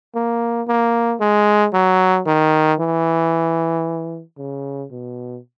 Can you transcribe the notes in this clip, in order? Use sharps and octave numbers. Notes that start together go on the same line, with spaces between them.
A#3
A#3
G#3
F#3
D#3
E3
C#3
B2